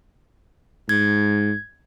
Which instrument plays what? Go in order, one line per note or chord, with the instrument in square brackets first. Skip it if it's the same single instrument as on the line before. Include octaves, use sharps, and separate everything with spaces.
[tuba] G#2 [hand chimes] G#6